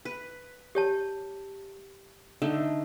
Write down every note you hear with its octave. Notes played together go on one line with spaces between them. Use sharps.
B4
G4 C#5 A5
D3 A3 D#4